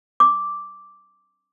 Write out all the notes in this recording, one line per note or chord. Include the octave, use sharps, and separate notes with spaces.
D6